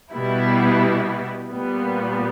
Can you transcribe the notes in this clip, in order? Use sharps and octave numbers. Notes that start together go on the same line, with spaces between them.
B2 G3 B3 E4
A#2 G3 B3